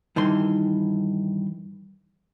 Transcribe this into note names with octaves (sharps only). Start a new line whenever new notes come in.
G2 D#3 E3 C6